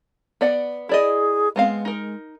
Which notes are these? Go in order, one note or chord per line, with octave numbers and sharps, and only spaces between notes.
B3 D5 F#5
E4 G#4 D5 D#5
G#3 B3 C4 F5
D#4 A#4